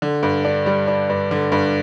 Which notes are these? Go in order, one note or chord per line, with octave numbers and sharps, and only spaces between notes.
D3
G2
D4
G3
D4
G2
D3
G2